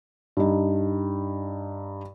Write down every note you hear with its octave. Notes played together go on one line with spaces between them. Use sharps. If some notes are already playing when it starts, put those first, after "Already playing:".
G2 D#4